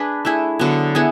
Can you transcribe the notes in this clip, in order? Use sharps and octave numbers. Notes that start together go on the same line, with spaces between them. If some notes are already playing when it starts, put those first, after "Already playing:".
Already playing: D4 G#4 B4
A3 E4 G#4
D3 F#3 B3
B3 E4 G#4